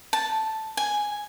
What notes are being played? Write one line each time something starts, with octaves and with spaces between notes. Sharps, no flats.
A5
G#5